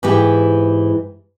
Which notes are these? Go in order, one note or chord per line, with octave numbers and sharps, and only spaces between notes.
G#2 E3 G4